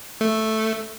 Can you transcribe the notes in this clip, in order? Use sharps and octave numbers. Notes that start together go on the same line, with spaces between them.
A3